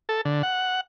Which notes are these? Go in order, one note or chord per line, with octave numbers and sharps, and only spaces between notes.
A4
D3
F#5